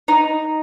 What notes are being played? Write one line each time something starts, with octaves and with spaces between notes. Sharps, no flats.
D#4